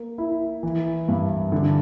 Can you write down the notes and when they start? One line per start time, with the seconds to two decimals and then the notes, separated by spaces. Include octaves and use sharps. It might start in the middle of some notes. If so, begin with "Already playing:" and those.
Already playing: A#3
0.18 E4
0.63 E3
1.08 G2
1.52 D3